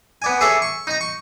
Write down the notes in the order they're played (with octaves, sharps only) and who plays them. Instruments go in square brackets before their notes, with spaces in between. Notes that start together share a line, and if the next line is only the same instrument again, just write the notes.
[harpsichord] B3 D5 G#5
G#4 A4 C#5 D5 E5 G#5
C#6
D#4 A#5
C#6